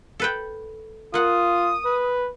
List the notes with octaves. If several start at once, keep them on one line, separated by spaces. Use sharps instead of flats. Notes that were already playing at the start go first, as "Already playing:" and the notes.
A4 B4 G5
A#3 F4 F#5 D#6
B4